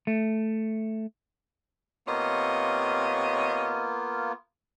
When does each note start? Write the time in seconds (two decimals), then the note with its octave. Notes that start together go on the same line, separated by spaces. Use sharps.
0.07 A3
2.07 C3 A#3 B3 F4 C#5 D#5